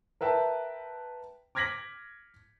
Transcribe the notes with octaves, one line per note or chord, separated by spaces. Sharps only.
A#4 B4 E5 G5 A5
D6 F6 G#6 A#6 B6 F#7